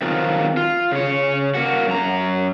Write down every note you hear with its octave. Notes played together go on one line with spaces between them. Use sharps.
D#3 F3 F#3 C4 D#4 F4
F4
C#3 C#5
A#3 F#4
F#2 A#5